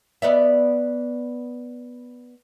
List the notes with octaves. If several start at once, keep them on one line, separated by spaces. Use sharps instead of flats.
B3 D5 E5